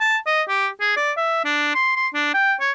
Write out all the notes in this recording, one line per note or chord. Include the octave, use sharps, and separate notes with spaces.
A5
D#5
G4
G#4
D5
E5
D4
C6
C6
D4
G5
C#5